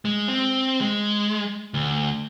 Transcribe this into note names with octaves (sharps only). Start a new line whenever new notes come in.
G#3
C4
G#3
D2